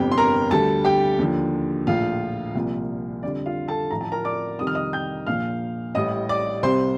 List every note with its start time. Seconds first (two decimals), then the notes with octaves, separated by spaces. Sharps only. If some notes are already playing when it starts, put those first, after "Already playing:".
Already playing: G1 F2 C3 G4 G5
0.12 C6
0.17 A#4 A#5
0.51 D2 D3 G3 A4 A5
0.85 G4 G5
1.19 D#2 D3 F3
1.87 A#1 A2 F3 F4 F5
2.55 C2 A#2 F3
3.23 F2 D3 G3 D5
3.46 F4 F5
3.68 A4 A5
3.91 A1 A2 F3 A#5
4.01 A5
4.12 A#4 A#5
4.24 D5 D6
4.59 F2 C3 D#3 G3 D#6
4.67 F6
4.75 D#5 D#6
4.93 G5 G6
5.27 A#1 A#2 F3 F5 F6
5.95 A1 A2 G3 D#5 D#6
6.29 D5 D6
6.63 C2 C3 G3 C5 C6